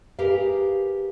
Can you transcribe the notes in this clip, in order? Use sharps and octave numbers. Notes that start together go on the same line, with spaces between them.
G4 G#4 A#4 B4 F5